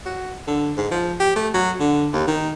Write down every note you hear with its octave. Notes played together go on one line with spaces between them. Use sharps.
F#4
D3
G#2
F3
G4
A3
F#3
D3
D#2
D#3